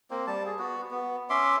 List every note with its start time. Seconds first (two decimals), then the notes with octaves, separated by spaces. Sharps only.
0.11 A#3 C4
0.27 G3 A5
0.46 G#4
0.59 B3 F#4
0.91 B3
1.30 C#4 E5 C6 D6